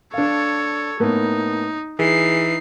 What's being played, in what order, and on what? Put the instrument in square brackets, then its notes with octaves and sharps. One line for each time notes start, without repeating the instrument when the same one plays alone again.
[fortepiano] D4 F5 [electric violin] A4 C#5
[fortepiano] A2 A#3 B3 [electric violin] D#4
[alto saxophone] E3 [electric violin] D#4 C7 [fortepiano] G#4